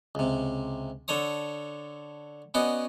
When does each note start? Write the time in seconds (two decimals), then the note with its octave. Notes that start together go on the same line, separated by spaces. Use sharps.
0.15 C#2 C3
1.08 D3 A4 C#5 D#6
2.54 B3 C#4 F#4 D5 D#5